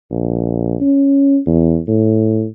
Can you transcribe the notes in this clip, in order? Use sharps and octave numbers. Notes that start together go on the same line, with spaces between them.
A#1
C#4
E2
A2